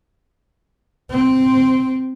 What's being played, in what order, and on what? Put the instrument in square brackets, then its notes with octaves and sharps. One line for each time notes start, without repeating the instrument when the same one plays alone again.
[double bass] C4